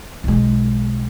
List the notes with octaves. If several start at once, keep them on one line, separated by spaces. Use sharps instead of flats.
B1 G#3